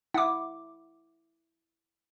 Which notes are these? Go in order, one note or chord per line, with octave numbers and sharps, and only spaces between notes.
E4 F#5 D6